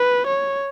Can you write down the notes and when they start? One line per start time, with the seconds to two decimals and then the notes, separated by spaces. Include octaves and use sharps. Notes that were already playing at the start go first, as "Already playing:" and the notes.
Already playing: B4
0.26 C#5